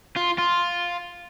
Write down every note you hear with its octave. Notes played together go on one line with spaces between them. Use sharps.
F4
F4